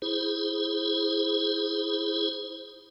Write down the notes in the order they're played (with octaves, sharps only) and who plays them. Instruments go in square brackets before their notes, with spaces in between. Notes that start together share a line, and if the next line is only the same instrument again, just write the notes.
[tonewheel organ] E4 G#4 C5